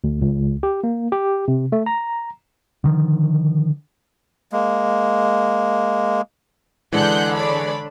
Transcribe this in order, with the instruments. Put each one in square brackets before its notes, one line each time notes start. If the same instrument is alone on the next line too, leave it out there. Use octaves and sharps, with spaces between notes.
[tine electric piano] D2
C#2
G4
A#3
G4
C3
A3
A#5
[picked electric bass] D3 D#3 F3
[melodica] G#3 A#3
[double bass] D3 D4 [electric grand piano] E3 G#3 [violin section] F#5 F#6 G6
[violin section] C#5 D5 B5